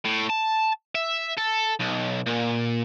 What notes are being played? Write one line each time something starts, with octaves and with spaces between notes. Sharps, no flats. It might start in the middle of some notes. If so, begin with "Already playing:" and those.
A2
A5
E5
A4
B1
A#2